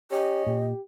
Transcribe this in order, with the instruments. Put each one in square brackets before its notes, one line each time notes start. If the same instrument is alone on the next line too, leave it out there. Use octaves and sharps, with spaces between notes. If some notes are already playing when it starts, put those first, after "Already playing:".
[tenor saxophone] C#4 [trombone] G4 [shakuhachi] D#5
[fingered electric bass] A#2 [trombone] G4